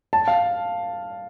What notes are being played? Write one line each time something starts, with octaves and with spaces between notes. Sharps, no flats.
A5
F5